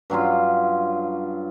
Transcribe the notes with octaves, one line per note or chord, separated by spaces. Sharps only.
G2 F#3 C#4 F4